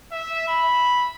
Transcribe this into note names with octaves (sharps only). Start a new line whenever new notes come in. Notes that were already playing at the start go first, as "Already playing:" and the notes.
E5
B5